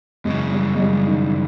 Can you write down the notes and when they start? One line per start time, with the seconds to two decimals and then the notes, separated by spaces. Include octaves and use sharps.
0.25 F#2 C#3 E3 G#3
0.52 G3
0.75 G#3
0.80 G3
1.07 D#3